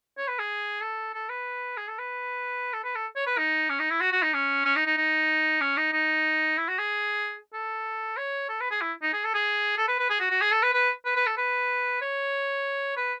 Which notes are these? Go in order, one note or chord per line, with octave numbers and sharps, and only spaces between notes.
C#5
B4
G#4
A4
A4
B4
G#4
A4
B4
A4
B4
A4
C#5
B4
D#4
C#4
D#4
E4
F#4
F#4
D#4
C#4
C#4
D#4
D#4
D#4
C#4
D#4
D#4
E4
F#4
G#4
A4
C#5
A4
B4
G#4
E4
D#4
G#4
A4
G#4
A4
B4
B4
G#4
F#4
F#4
G#4
A4
B4
B4
B4
B4
A4
B4
C#5
B4